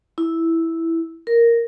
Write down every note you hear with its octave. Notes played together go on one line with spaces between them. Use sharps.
E4
A#4